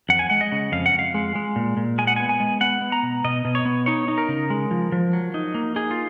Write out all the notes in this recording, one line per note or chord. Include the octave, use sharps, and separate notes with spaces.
F2 F#5
G#5
G#3 F#5
D#5
C#3
F2 F5
F#5
F2
F5
G#3
G#3
A#2
A#2
G#3 G#5
F#5
B3 G#5
G#5
G#3
B3 F#5
B3
A#5
B2
B2 D#5
B2
C#5
B3
D#4 C#5
D#4
A#4
C#3
G#3
F3
F3
F#3
D#4
A#3
D#4 G#4
F4